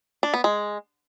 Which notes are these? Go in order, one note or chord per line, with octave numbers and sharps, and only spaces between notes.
D4
B3
G#3